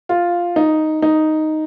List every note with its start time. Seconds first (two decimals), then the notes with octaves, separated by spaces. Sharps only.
0.09 F4
0.56 D#4
1.02 D#4